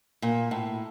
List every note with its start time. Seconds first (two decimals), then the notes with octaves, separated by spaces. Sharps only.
0.22 A#2
0.51 A2